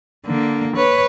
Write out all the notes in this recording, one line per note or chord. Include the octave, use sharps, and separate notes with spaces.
D3 A#3
B4 C#5